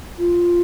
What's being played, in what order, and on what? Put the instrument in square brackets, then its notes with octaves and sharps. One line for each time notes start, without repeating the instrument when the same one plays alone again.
[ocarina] F4